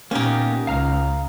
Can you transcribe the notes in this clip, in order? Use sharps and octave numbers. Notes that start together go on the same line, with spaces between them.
A#2 A#3 B3 C#4 D#4 G4
C#2 F5 A#5 F6